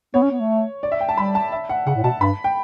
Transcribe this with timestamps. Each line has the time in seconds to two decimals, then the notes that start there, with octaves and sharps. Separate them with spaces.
0.14 B3 C#5
0.23 C#4
0.32 B3
0.40 A3
0.83 D5
0.92 E5
1.00 G5
1.09 A5
1.17 G3 B5
1.35 A5
1.52 E5
1.69 F#5
1.87 C#3 F#5
1.96 A2
2.04 B2 A5
2.21 G2 B5
2.44 G5